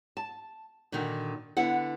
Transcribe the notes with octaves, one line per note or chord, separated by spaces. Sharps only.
A5
A#2 D3 D#3 D#4 F#4
D3 B3 E4 F#5